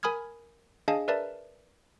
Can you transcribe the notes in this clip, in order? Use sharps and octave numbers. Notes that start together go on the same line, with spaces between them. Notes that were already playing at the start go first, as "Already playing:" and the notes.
A#4 G#5 B5 D#6 F6 G#6
D4 G#4 D#5 F5 G#5 A5
A#4 B4 D5 E5 A5